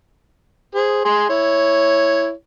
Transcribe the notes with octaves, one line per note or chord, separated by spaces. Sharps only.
G#4 C5
G#4 G#5 C6
E4 C#5